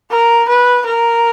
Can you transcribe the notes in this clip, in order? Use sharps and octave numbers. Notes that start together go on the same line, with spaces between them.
A#4
B4
A#4